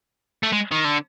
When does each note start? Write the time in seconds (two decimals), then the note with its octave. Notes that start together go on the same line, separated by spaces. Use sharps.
0.43 A3
0.53 G#3
0.72 D#3
0.85 D3